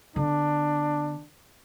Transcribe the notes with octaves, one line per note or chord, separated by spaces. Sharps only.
D3 B3 D4